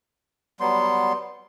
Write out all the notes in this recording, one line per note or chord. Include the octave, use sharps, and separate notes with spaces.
F#3 G3 B3 C6